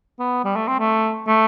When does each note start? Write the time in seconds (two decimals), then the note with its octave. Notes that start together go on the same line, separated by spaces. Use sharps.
0.19 B3
0.44 G3
0.56 A3
0.67 C4
0.79 A3
1.27 A3